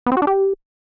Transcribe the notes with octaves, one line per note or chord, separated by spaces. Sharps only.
B3
C4
F#4
D4
G4